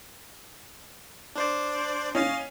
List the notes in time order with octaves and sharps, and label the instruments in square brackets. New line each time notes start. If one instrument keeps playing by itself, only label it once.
[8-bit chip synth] D4 C5 D5
[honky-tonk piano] C#4 [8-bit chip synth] D#5 F5 A6